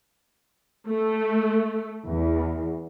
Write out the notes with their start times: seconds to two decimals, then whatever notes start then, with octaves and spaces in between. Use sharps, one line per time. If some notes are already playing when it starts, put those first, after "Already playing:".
0.88 A3
2.06 E2